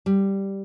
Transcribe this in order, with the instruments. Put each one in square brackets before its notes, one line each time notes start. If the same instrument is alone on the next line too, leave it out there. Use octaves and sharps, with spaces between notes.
[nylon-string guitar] G3